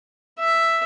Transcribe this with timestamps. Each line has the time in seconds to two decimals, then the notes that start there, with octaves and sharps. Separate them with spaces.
0.39 E5